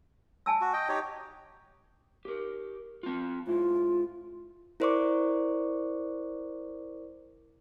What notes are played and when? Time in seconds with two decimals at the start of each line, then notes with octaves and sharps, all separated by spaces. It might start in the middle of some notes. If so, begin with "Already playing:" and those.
0.46 G#5 A5 E6
0.61 F#4
0.73 D#5 G5
0.89 D#4 G4 C#5
2.25 G4 A#4
3.03 C4 F4
3.47 G#2 E4 F4
4.80 E4 A#4 C5 D5 C#6 D6